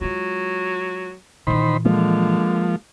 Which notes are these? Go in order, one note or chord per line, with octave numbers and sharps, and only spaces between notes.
F#3 G#3 F4
A#2 D#3 E3 C5 B5
D3 F3 G#3 A#3